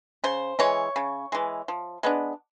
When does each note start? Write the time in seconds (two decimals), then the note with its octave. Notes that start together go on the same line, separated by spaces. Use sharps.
0.24 C#3 C5
0.59 E3 G#3 C#5
0.96 C#3
1.32 E3 G#3
1.68 F3
2.03 G#3 B3 D4